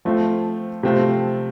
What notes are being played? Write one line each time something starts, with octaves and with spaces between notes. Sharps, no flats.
F3 A3 C4 F4
C3 F3 A3 C4 F4